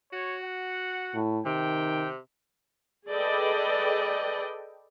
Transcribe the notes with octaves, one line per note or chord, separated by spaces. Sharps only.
F#4 C#5
F#5
A2
C3 D#3 G5
G#4 A4 B4 D5 D#5 G5